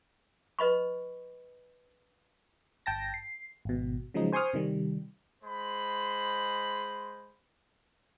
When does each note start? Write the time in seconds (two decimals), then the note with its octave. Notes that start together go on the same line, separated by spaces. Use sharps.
0.59 B4 D#5 B5 C#6
2.86 G1 G5 A5 A#6
3.14 C7
3.65 G#1 B2
4.14 C#3 F3 F#3 G#3 D#4
4.32 C5 G#5 C6 C#6 D#6 F6
4.53 C3 D#3 G3
5.43 G#3 C5 B5